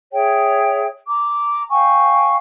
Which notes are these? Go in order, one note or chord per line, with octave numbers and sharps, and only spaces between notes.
G#4 C#5 E5 G5
A#5 D6
F5 G5 G#5 C#6